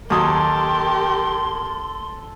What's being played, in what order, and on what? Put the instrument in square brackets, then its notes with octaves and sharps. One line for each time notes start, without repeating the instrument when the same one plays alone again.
[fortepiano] D#2 F#3 D#6 [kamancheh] G4 A#4 [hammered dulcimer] A4 [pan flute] C6